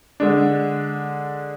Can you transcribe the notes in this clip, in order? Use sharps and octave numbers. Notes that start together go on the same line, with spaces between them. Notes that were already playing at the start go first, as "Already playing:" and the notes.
D3 G#3 D4